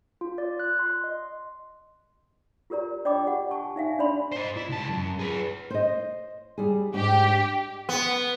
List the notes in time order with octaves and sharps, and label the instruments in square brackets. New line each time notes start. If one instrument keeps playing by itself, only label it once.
[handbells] F4
D5
F#6
C6
D#5
[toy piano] F4 G4 A#4 D5 A#5
D4 D5 D#5 G5 B5 D6
G4 F#5
G#5 A5 C#6
D#4 E5 F5 G#5
D4 D5 B5 C6
[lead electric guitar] C5 D#5
E4
C#2 A5
F#2
G#4 B4
[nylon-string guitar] C5 D#5
G3 G#4
[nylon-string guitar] G#2 D4 [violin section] G4
[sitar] B3